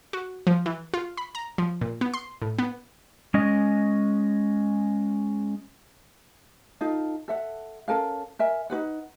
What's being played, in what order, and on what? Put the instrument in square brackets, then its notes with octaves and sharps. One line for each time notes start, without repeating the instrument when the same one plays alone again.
[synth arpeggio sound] F#4
F3
E3
F4
B5
A#5
F3
A#2
B3
C6
A2
B3
[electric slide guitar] G#3 C#4 D#5
[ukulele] D#4 F4 A4 F5
A4 E5 F#5
C#4 A4 A#4 F5
A#4 E5 G#5
D#4 F#4 B4 F#5